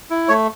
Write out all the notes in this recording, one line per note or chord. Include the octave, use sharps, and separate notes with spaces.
E4
A3 C#5